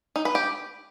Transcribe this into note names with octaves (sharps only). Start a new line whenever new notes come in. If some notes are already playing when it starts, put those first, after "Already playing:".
D#4
B4
G4